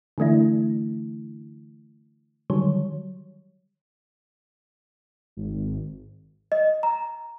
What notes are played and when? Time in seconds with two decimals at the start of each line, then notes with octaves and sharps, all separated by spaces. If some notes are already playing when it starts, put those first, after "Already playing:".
0.18 D3 E3 A3 D4 E4
2.50 D3 D#3 F#3 G3 C#5
5.37 G#1
6.52 D#5
6.83 A#5